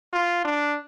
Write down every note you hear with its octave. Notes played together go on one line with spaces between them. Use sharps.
F4
D4